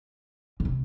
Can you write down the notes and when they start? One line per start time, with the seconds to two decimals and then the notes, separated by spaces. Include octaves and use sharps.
0.60 C#3
0.65 C3